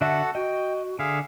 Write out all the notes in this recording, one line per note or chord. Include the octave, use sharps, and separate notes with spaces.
D3 F#4 A4 E5 F#5
F#4 D#5 G5
D3 G#4 E5 F5 G#5